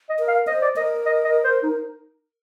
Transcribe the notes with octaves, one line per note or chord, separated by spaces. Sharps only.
D#5
A#4
F5
C5 D#5
D5
A#4 D#5
D#5
D#5
C5
D#4